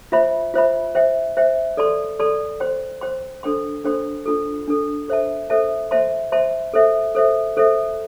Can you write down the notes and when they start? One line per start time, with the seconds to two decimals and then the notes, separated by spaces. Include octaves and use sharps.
0.12 F4 C5 E5 B5
0.54 F4 C5 E5 B5
0.95 C5 E5 G5
1.37 C5 E5 G5
1.77 A4 D5 A5 C6
2.19 A4 D5 A5 C6
2.60 C5 G5 C6
3.01 C5 G5 C6
3.43 D4 A4 C5 G5 C6
3.84 D4 A4 C5 G5 C6
4.26 D4 F4 A4
4.67 D4 F4 A4
5.08 A4 C5 E5 A5
5.50 A4 C5 E5 A5
5.91 C5 E5 A5 C6
6.32 C5 E5 A5 C6
6.74 A4 C5 E5
7.15 A4 C5 E5
7.57 A4 C5 E5